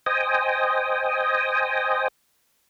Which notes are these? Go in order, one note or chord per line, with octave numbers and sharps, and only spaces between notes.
C5 D#5 G5 G#5 D#6